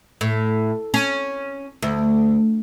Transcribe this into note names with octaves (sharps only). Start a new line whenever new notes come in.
A2
C#4
D2